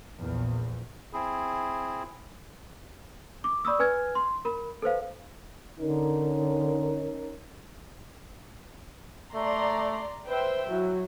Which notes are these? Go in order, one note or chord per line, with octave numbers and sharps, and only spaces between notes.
A#1 E2
C4 E4 G#4
D6
D5 B5 C#6 D#6 E6
B4 G#5 F6 G#6
C6
A#4 B5
A4 B4 C5 F5
D3 C#4 D#4 A#4
A3 D5 A#5 C6
B4 C5 E5 G5
F#3 E4